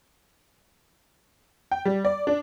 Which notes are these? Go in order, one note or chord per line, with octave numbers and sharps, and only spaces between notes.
G5
G3
D5
D4